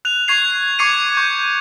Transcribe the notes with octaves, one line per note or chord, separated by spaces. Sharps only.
F#6 F7
C#6 G#6 C7 F7
C#6 D6 G#6 C7 C#7 D#7
C#6 G6